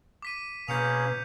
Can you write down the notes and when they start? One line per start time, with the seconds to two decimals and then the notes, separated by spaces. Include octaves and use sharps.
0.22 D6 B6 D#7
0.68 B2 A#3 C#4 G#4 B4 G6 C#7 F7